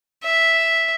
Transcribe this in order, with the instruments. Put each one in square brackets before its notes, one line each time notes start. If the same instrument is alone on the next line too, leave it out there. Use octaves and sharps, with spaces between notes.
[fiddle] E5